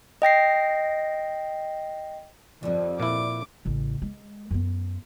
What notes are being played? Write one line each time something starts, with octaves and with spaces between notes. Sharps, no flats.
D#5 G5 A#6 C7
F2 D3 G3
A#2 E4 D6
A1 C#3
G#3
F#2 B3